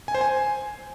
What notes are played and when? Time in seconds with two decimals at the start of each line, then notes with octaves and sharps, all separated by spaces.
0.08 G#5
0.15 C5
0.21 G#5